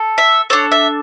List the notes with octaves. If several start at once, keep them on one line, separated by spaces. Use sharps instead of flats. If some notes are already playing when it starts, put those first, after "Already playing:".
Already playing: A4
E5
D4 A4 C#5
E5